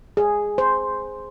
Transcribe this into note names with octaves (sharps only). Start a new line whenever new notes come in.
G#4
C5